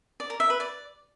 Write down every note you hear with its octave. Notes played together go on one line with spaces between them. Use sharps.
D5
A#4
E5
B4
D5